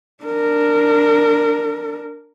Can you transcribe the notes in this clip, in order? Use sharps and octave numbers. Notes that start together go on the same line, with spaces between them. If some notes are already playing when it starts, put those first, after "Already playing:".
D4 A#4